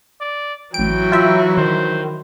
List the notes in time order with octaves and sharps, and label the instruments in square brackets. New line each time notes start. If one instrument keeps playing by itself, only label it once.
[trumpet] D5
[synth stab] A1 D7 [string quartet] E3 F#3 E4 [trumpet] G5
[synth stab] F4 E5
[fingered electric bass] D#3 [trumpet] C5